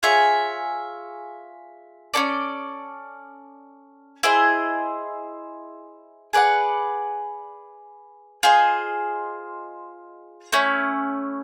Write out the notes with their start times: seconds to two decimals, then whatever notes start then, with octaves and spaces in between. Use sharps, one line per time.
0.03 F4 G#4 C#5 E5
2.14 C#4 E4 A4 D5
4.23 E4 G#4 C5 D#5
6.33 G#4 B4 D5 F#5
8.43 F4 G#4 C5 D#5
10.52 A3 C#4 E4